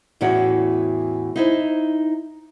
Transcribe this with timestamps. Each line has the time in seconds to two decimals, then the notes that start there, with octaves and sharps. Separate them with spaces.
0.21 E2 A2 E3 C#4 F#4 F#5
1.36 D#4 E4 C5